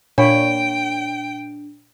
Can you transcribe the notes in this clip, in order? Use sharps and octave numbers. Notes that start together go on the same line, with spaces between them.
A#2 D4 C#5 G5 G#5 B5